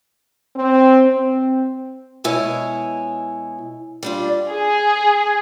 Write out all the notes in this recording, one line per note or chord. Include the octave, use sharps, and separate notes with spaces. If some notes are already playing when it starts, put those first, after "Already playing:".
C4
C4
B2 G#3 E4 C#5 G#5
G3 D4 F4
G#4